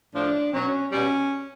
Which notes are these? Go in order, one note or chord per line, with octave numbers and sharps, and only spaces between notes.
A2 F3 D4
B2 F#3 C#4
B2 G3 C#4